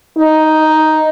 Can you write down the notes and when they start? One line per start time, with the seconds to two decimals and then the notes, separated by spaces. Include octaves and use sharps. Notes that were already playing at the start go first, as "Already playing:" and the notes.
0.18 D#4